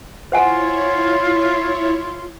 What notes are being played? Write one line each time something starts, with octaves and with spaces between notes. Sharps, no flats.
E4 F4 C5 C#5 F#5 G#5